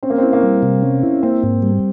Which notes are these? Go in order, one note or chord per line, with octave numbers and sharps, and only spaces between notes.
C4 C#4
A#3
C4 E4
A#3
G3
C3
C#4
E4
A#3 C4
G#2
G3